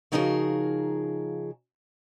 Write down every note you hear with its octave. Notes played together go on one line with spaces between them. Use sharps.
C#3 F3 D#4 F#4 G#4 A#4